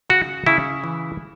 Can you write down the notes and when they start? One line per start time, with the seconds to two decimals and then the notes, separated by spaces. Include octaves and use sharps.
0.10 C#3 F#4
0.47 C#3 E4
0.84 E3